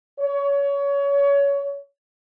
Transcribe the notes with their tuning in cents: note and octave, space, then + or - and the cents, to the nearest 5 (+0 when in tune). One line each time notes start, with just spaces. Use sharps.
C#5 +25